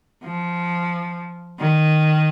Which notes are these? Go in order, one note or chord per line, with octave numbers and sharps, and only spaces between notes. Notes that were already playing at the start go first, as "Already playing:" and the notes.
F3
D#3